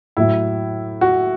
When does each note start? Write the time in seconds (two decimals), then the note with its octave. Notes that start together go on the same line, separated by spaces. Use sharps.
0.17 A2 F#3 E4
1.01 F#4